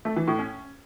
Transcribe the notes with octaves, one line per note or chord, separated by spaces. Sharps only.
A3
E3
A2
C#4